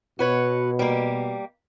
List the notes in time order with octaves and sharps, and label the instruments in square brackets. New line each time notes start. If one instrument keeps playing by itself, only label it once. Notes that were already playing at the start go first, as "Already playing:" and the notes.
[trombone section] B2 [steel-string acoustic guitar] F#4 B4 C#5
[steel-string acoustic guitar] G3 A#3